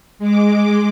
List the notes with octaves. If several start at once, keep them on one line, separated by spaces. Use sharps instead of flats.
G#3 D6